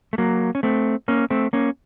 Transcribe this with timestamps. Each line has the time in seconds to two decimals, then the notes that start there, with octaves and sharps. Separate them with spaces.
0.13 A3
0.18 F#3 A#3
0.55 C#4
0.63 A3 C4
1.08 A#3 C#4
1.30 A3 C4
1.53 A#3 C#4